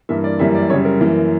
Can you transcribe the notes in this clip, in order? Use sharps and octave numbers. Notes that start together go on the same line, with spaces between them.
G2 E3 A#3 E5
D5
F#2 E3 G3 A#3 E5
D5
F#2 C#3 G3 C#5
A#4
F#2 E3 A#3